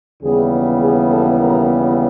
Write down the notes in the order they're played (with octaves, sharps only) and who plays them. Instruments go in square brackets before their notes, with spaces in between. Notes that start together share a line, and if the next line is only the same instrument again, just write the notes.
[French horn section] D#2 C#3 E3 G3 B3 G#4
G#4
A4
A#4